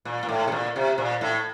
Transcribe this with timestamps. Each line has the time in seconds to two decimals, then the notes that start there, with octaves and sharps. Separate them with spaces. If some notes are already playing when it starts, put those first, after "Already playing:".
0.05 A#2
0.23 A#2
0.29 A2
0.47 C3
0.52 A#2
0.76 C3
0.98 A#2
1.21 A2